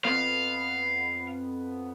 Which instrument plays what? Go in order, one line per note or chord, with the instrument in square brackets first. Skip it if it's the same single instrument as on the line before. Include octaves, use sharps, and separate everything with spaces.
[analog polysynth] F2 B3 [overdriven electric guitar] F5